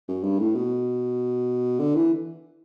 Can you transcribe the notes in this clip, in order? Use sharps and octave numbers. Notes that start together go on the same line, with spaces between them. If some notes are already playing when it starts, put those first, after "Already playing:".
F#2
G2
A2
B2
D3
E3